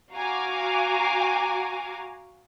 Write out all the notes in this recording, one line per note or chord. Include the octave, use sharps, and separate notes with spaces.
F#4 F5 G#5 A#5 D6